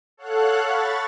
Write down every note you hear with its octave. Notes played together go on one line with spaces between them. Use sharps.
A4 C#5 F5 F#5 F#6
B5 C#6 A6